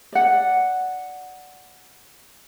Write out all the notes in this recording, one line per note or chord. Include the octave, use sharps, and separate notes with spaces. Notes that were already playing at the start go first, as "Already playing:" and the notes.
D5 F#5